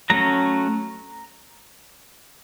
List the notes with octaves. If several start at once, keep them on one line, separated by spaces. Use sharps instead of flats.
F#3 A3 C#4 A#5